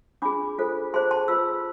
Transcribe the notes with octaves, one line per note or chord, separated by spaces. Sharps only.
D4 F4 G#4 B5 D6
F4 A4 C5
F4 G#4 C5 A5 C6
A5 C6
F4 B4 C6 E6